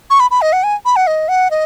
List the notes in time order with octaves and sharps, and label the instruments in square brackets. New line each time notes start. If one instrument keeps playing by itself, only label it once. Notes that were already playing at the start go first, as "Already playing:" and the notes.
[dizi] C#6
B5
B5
D#5
F#5
G#5
B5
F#5
D#5
F#5
D#5